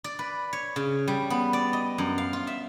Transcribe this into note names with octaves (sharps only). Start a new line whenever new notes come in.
D5
B4
C#5
C#3
G3
B3
D5
D#5
F#2
F5
F4
E5